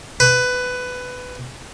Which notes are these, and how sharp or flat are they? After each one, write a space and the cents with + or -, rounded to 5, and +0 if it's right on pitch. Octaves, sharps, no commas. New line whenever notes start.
B4 +15